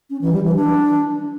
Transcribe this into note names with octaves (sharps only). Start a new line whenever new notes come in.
C#4
E3
G3
E3
D4